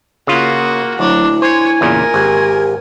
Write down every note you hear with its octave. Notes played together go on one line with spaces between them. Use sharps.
C#3 A#3 F4 F#4
D2 F#3 D4 E4
C5 C#5 G#5
E2 A#2 C#3 A#4
G#1 G4